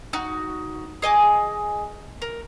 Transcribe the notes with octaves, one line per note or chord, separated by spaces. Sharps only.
D#4 F#4
G#4 D#5 G#5 D6
A#4